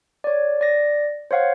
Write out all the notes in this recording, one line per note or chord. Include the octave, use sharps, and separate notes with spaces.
C#5 D5
D5 A#6
C5 C#5 F5 F#5